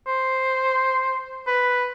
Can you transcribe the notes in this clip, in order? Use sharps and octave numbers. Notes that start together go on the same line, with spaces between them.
C5
B4